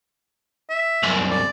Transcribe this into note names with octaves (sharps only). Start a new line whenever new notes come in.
E5
C2 F#2
D5